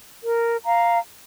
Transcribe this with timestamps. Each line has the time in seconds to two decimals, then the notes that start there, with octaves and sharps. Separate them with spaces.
0.23 A#4
0.64 F5 A#5